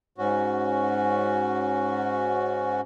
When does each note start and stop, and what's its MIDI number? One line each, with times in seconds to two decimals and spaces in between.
0.18 2.81 44
0.18 2.81 61
0.18 2.81 66